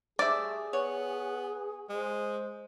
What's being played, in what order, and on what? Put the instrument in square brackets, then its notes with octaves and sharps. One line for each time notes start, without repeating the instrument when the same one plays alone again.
[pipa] G3 A3 C5 [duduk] G#4 [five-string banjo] D5 E5
[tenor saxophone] B3 [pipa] C#5
[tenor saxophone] G#3 [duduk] C5